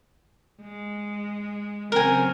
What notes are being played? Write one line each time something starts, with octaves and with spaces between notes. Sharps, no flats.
G#3
C#3 F#3 C4 A#4 G#5